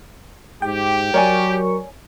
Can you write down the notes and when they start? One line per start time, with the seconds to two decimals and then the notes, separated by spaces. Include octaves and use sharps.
0.62 G#2 G4 G5
1.14 F#3 A#4 C#5 D5 G#5 C#6